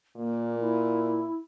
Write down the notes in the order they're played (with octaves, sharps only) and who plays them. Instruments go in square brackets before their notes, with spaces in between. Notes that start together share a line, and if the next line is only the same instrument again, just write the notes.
[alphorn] A#2 [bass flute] A#3
[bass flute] E4